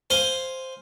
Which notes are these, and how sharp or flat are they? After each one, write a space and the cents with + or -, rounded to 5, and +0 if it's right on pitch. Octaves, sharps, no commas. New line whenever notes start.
C5 +0 F5 +0 G#5 -5